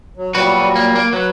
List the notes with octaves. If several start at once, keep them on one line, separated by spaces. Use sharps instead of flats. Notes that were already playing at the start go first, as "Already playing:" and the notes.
F#3
A#2 F#3 G3 F#4 B4
A#3
A#3
F#3 B4 F#5